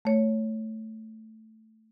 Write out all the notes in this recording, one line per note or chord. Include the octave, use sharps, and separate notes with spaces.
A3 C#5